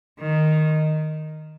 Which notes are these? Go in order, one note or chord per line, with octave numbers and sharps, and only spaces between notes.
D#3